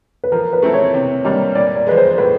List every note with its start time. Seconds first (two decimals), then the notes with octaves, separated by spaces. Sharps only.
0.24 B4
0.32 F3 A#4
0.53 B4
0.62 A3 C4 E4 A4
0.73 C#5
0.94 C3
1.24 D#3 G3 A#3 D4
1.55 A#2 D5
1.76 D5
1.87 F3 G#3 B4
1.97 C5
2.18 A2 B4